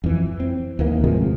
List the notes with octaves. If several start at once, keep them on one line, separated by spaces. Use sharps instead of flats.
F2 E3
C4
D#2 E3 A#3
A2 C3 F3 G#3